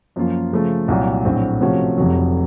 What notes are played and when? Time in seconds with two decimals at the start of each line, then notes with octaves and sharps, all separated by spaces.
0.16 F#2 F3 A#3 F4
0.52 C#3 F3 A3
0.88 C2 A#2 F#3
1.25 A#1 A2 F#3 C4
1.61 C3 F3 A3 C#4 F#4
1.98 F1 F2 C3 F#3